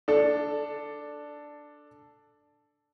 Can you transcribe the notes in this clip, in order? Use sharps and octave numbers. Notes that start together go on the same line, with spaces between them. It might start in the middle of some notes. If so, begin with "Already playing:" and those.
D4 A4